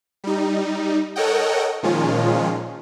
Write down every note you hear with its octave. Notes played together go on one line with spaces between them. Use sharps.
G3 D#4
A4 A#4 C#5 D#5 F#5 G5
A#2 D#3 F3 G#3 C#4 F4